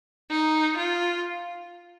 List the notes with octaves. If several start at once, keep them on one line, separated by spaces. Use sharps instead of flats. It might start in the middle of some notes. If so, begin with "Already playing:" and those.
D#4
F4